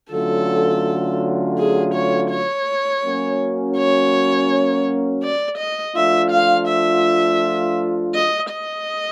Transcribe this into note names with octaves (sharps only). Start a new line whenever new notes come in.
D3 F#3 A3 C#4 F4 A4
G#4
C#5
C#5
F#3 A#3 C#4 F#4
C#5
D5
D#5
F3 A3 D4 F4 E5
F5
E5
D#5
D#5